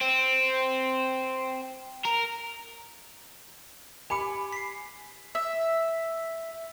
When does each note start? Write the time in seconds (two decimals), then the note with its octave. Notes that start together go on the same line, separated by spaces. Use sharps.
0.01 C4
2.05 A#4
4.10 G4 G#5 B5 D6 C#7
4.53 B6 C7
5.35 E5